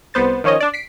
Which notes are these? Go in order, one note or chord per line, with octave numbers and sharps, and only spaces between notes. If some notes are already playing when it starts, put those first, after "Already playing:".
C2 B3 C5 A6
D#3 F3 C#4 C#5 D#5
D4 D5
B6 C7 D7